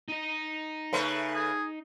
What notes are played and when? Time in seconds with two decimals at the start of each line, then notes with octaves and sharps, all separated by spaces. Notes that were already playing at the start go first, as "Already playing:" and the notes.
0.08 D#4 D#5
0.93 C#3 A3 B4
1.35 G#4